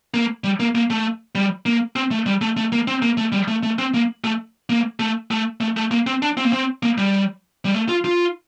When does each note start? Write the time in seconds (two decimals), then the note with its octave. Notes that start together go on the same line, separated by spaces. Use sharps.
0.14 A#3
0.44 G3
0.60 A#3
0.75 A#3
0.90 A3
1.35 G3
1.66 A#3
1.96 C4
2.11 A3
2.26 G3
2.41 A3
2.57 A3
2.72 A#3
2.87 C4
3.02 A#3
3.17 A3
3.32 G3
3.48 A3
3.63 A3
3.79 C4
3.94 A#3
4.24 A3
4.70 A#3
5.00 A3
5.31 A3
5.61 A3
5.77 A3
5.91 A#3
6.07 C4
6.22 D4
6.37 C4
6.45 A#3
6.53 C4
6.83 A#3
6.98 G3
7.65 G3
7.74 A3
7.89 F4
8.05 F4